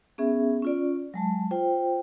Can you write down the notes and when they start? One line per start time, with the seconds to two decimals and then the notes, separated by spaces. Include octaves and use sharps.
0.18 B3 C#4 G#4 E5
0.62 C#4 F4 D5
1.14 F#3 G#3 A5
1.51 F4 C5 G5